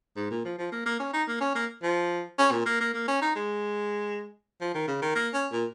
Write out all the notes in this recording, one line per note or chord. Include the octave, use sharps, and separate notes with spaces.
G#2
A#2
F3
F3
A#3
A#3
C#4
D#4
A#3
C#4
A#3
F3
C#4
A#2
A#3
A#3
A#3
C#4
D#4
G#3
F3
D#3
C#3
D#3
A#3
C#4
A#2